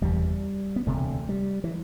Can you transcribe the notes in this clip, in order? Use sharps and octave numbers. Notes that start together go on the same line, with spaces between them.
F#1 E2 C3 G3
B3
E1 D2 C3 A3
G3
E3